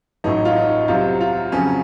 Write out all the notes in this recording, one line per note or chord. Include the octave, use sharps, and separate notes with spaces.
A1 A2 F#3 D#4
F4
D#4
C2 C3 F#3 F4
F4
F2 C#3 F#3 C#4